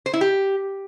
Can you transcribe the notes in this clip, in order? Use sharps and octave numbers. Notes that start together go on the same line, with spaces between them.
C5
E4
G4